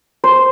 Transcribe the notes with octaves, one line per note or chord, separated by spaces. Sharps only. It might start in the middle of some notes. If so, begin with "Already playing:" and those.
C5